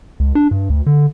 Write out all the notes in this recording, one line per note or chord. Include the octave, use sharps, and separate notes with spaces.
C#2
D4
G2
D2
D3